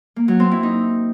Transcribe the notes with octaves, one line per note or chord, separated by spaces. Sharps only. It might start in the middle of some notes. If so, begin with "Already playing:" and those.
A#3
F#3
C4
E4
D#4